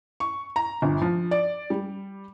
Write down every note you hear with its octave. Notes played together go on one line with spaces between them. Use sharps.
C#6
A#5
G1
F3
D5
G3